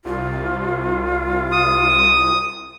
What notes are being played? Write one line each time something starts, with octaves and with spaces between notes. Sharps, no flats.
C2 F4
D#6